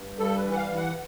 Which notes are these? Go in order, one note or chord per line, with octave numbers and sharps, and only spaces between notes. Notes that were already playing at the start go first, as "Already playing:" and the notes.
Already playing: G2
G3 A4
B4
E3
F#5
F5
E3
F#5